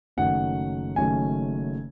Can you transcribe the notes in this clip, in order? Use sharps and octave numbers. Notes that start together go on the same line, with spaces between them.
F#1 F#2 D#3 A3 C#4 F#5
F#1 F#2 D#3 A3 C#4 G#5